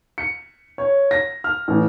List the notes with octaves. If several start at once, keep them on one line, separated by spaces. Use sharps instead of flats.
C#7
C#5
A#6
F6
A1